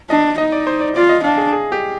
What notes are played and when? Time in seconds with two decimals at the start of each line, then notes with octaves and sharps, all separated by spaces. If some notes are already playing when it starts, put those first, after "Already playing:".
0.10 D4 D#5
0.38 D#4 D#5
0.52 D5
0.67 C5
0.81 D5
0.96 F4 D5
1.09 D#5
1.23 D4 F5
1.38 G#4
1.53 G#4
1.72 G4